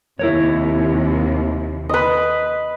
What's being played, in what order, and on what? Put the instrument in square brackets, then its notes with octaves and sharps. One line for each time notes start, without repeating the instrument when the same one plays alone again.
[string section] D#2 C3 [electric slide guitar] E4 A#4 C#5
[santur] B4 D#5